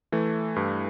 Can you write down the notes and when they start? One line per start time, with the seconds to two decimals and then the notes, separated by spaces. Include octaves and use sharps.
0.12 E3 A3
0.56 G2